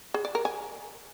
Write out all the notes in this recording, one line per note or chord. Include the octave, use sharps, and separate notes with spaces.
G#4
D5
A#4
G#5